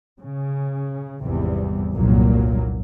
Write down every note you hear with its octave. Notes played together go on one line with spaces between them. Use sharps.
C#3
G#1 E2 C3 G3
F1 C2 G2 A#2 F#3 A#3